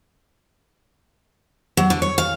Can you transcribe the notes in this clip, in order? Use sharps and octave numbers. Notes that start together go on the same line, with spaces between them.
F#3
D3
C#5
F5